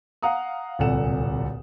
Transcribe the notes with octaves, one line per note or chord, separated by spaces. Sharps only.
F5 F#5 A#5 D#6
D1 C2 A#2 A4 F#5 E7